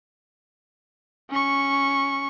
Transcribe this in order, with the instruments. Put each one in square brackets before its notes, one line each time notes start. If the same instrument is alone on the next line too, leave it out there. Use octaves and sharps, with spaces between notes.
[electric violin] C#4 C#6